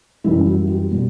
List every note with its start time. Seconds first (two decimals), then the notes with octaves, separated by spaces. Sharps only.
0.24 F#2 E3 G3 E4
0.45 F#4
0.67 G4
0.90 B2 G3